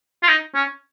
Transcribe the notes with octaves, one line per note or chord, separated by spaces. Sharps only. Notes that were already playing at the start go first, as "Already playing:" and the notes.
F4
D#4
C#4